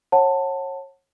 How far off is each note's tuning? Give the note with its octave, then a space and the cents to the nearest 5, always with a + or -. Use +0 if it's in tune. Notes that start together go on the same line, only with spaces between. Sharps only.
C#5 -30 F#5 +0 A5 +15